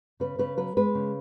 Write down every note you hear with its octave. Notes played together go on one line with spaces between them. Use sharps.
C#3 B4
C#3 B4
F#3 B4
G#3 B4
C#3